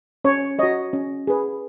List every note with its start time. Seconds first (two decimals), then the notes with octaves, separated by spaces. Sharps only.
0.25 C#4 C#5
0.59 F#4 C#5 D#5
0.93 C#4
1.27 G#4 B4